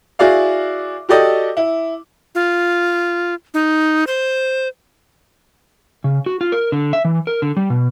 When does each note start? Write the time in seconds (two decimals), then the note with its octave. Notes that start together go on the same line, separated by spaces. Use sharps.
0.19 E4 F#4 G#4 D5 F5
1.09 F#4 G4 A4 D5 D#5
1.57 E4
2.35 F4
3.54 D#4
4.07 C5
6.04 C#3
6.26 F#4
6.41 F4
6.52 A#4
6.72 D3
6.93 E5
7.05 E3
7.27 A#4
7.42 D3
7.57 G3
7.70 B2